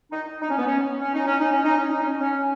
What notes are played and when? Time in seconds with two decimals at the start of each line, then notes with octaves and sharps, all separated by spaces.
0.12 D#4
0.42 D#4
0.50 C#4
0.58 B3
0.67 C#4
1.01 C#4
1.14 D#4
1.27 C#4
1.40 D#4
1.52 C#4
1.65 D#4
1.77 C#4
1.90 D#4
2.03 C#4
2.21 C#4